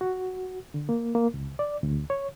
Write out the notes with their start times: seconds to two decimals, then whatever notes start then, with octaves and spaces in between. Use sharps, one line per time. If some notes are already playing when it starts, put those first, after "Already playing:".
0.01 F#4
0.74 D3
0.89 A#3
1.15 A#3
1.34 C#2
1.59 D5
1.83 D2
2.10 C#5